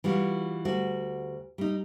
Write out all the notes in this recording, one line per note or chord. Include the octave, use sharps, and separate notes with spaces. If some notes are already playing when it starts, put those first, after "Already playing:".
E3 G3 F4 F#4
D2 G3 F#4
G3 D#4